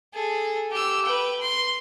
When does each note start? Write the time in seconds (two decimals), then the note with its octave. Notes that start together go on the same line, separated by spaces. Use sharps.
0.13 G#4 A4
0.71 G4 E6
1.05 B4 G5
1.41 C6